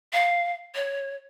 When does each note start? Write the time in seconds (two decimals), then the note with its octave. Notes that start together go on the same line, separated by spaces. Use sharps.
0.13 F5
0.75 C#5